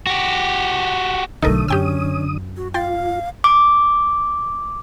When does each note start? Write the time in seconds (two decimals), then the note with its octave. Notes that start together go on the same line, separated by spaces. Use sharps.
0.07 F#4 G4
1.42 B1 D3 F#3 A3 D#4 A4 A#4 D#6
1.68 F#2 C#4 G4 G5 E6
2.57 F#4
2.74 F4 F5 G5 C6 A6
3.44 D6